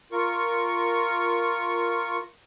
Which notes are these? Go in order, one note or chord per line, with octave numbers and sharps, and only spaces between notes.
F4 A#4 C#6